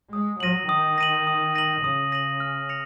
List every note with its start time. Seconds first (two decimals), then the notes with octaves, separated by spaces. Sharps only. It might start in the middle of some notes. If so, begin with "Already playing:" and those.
0.13 G#3 D#6
0.40 F#3 A#6 D#7 F#7
0.69 D#3 D#6
0.98 A#6 D#7 F#7
1.27 D#6
1.55 A#6 D#7 F#7
1.84 C#3 D#6
2.12 A#6 D#7 F#7
2.40 F6
2.69 A#6 C#7 F7